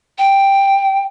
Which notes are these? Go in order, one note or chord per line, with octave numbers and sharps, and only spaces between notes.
G5